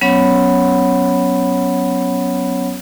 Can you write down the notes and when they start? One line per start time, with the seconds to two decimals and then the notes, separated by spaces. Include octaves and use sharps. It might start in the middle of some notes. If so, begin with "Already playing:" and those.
0.01 F#3 B3 C#4 C#5 F#5 B5